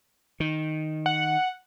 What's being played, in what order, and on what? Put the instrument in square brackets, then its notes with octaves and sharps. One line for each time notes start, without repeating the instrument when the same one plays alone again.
[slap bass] D#3
[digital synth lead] F#5